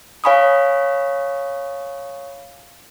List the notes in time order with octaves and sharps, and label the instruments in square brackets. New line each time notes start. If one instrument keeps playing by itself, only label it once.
[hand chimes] C#5 F5 G#5 B5 C#6 D#6